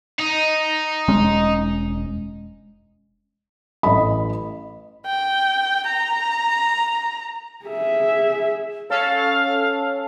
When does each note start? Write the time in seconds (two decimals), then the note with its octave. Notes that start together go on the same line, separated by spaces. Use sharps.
0.19 D#4
1.08 E1 G#3 C#4
3.83 A1 D#5 B5
5.06 G5
5.88 A#5
7.66 G#4 E5
8.90 C#4 A4 F5